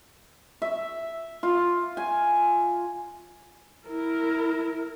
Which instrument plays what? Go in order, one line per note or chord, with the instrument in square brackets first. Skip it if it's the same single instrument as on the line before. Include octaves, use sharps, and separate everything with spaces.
[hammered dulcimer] E5
F4
G#5
[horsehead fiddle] E4 A#4